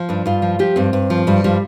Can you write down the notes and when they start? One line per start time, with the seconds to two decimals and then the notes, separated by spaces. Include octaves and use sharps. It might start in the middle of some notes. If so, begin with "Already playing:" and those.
Already playing: F3
0.09 G2 D4
0.26 G2 F4
0.42 F3
0.59 F3 G4
0.76 G2 C4
0.93 G2
1.10 F3
1.27 G2 G3
1.44 F3 G3